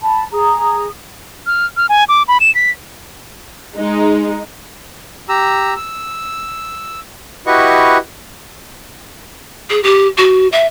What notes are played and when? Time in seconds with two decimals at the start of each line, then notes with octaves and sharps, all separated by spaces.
0.02 A5 B5
0.33 G#4 A#5 D#6
1.47 F6
1.77 F6
1.89 G#5
2.09 D6
2.28 B5
2.40 E7
2.55 B6
3.76 G#3 D#4
5.29 G4 A#5 E6
5.77 E6
7.46 E4 F#4 G4 B4 D#5 C#6
9.70 G#4
9.83 G4
10.17 F#4
10.52 E5